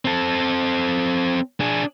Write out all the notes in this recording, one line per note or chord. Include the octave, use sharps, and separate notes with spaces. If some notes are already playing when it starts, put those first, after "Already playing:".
C4 A4
D4 G#4